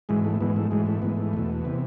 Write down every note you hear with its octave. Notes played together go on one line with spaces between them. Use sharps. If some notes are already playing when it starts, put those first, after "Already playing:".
G#2 E3 G#3
A3
G#2 E3 B3
A3
G#2 E3 G#3
A3
G#2 E3 B3
A3
E2 B2
C3 E3 B3